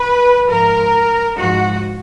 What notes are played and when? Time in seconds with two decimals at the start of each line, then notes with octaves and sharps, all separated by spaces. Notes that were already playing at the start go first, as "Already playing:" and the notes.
Already playing: B4
0.49 G#2 F3 A#4
1.37 G#2 F3 F#4